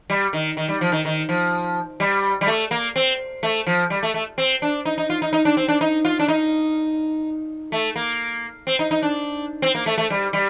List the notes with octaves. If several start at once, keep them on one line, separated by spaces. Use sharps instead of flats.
G3
D#3
D#3
G3
F3
D#3
D#3
F3
G3
G3
A3
A#3
C4
A3
F3
G3
A3
A3
C4
D4
D#4
D#4
F4
D#4
D#4
D4
C4
D4
D#4
F4
D4
D#4
A3
A#3
C4
D#4
D#4
D4
C4
A#3
A3
A3
G3
G3